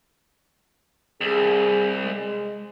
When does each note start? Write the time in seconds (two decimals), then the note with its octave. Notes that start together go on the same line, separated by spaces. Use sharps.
1.21 C2 G#4
2.03 G#3